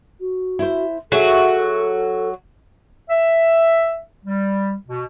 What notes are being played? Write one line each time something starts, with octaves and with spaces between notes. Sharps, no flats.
F#4
E4 C5
F#3 F#4 G#4 A4 E5
E5
G3
B2